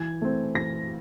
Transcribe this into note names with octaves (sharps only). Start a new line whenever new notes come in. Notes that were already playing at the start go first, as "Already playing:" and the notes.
Already playing: E3 G#6
A3 C4
E3 A#6